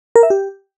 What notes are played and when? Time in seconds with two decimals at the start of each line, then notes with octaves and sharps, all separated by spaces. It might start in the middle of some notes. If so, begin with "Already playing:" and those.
0.16 A#4
0.23 E5
0.30 G4